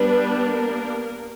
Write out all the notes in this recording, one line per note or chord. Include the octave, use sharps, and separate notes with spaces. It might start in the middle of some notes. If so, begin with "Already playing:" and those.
Already playing: G3 B3 D4 B4
A#3 A#4